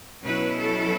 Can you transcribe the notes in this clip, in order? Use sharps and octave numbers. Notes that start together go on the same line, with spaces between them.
B2 F#3 C#4 E4 B4
A4